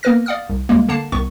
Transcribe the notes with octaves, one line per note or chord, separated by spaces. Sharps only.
A#3 B3 A#4 B4 F6 A#6
D5 F5 F#5 D#6 F6
C2
D2 G3 G#3 A#3
D3 A#3 F#5 A5 C7
C2 D#3 B3 C#6